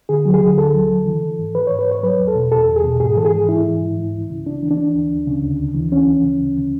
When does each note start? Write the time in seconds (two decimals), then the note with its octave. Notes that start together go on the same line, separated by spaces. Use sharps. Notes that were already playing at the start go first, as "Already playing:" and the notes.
0.09 D3 G#4
0.25 F#3
0.34 G#4
0.42 D3
0.58 D2 A4
0.74 F#3
0.90 D3
1.06 E3
1.23 E3
1.38 G#2
1.55 E3 B4
1.67 G#2 C#5
1.79 B4
1.87 G#2 C#5
2.03 F#3 B4
2.20 E2
2.28 A4
2.35 B2
2.52 E2 A4
2.68 E2
2.76 G#4
2.84 B2
3.00 G#2 G#4
3.17 E3 A4
3.25 G#4
3.33 G#2
3.49 G#2 E4
3.65 E3
3.81 G#2
3.98 E3
4.14 C#2
4.30 C#3
4.46 C#2 D4
4.63 E3
4.71 D4
4.78 E3
4.94 D2
5.11 D2
5.27 C#3
5.42 D2
5.59 D2
5.75 E3
5.91 E3 C#4
6.08 D2
6.23 C#3
6.40 D2
6.56 E3